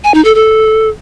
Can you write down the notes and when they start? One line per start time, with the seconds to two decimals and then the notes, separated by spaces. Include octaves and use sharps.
0.04 G#5
0.14 D#4
0.25 A4
0.35 A4